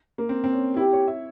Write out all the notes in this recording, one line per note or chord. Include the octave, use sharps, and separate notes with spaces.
A#3
C4
C4
C#4
E4 G4
C#5
E5